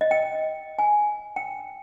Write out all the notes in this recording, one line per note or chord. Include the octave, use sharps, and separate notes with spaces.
D#5
G5
G#5
G5